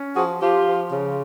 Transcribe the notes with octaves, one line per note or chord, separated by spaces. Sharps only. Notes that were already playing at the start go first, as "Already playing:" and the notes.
Already playing: C#4
F3 F#4 G#4
F3 F4 G4
F3
C#3